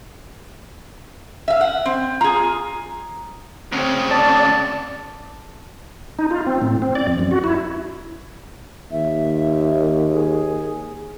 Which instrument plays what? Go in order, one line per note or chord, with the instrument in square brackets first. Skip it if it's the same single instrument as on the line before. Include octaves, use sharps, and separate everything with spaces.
[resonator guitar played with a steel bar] E5 F5
F#5
C4
[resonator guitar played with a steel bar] F4 G#4 [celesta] A#5
[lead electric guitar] D2 C#3 [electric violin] C4
[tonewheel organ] D5 [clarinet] A5
[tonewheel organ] D#4
F4
C4
A2
C4
D5
F2
F#2
F#4
E4
[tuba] D#2 [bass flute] E5
[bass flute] G#4